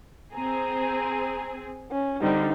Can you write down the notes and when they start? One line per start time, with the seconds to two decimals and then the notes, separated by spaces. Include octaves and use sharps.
0.34 C4 G#4 A#5
1.92 C#4
2.21 D3 G3 C4 D#4